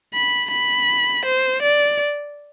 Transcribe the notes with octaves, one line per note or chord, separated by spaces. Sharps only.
B5
B5
C5
D5